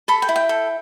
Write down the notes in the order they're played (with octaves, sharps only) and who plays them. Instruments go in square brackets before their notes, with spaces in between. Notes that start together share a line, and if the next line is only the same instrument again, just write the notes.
[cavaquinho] A4 B5
G5
E4
G5
A4